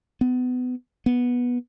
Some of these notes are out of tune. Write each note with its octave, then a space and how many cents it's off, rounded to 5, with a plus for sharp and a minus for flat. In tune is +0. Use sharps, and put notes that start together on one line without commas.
B3 +25
B3 -10